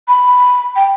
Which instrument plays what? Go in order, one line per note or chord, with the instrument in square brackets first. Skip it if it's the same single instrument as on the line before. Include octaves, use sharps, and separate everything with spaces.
[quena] B5
G5